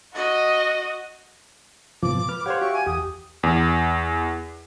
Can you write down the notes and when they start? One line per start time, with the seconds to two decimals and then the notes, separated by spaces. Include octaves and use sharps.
0.13 F#4 D#5
2.03 G#2 C3 F3 B3 D6
2.29 B4 F6
2.46 G4 C5 C#5 F5 F#5 D6
2.61 F#4 G4 E5 C#6
2.73 G#5
2.86 E2 G4 D#6
3.43 E2